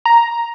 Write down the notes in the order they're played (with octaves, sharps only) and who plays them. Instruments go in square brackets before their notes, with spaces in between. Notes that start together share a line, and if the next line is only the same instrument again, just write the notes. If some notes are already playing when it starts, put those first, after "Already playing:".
[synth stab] A#5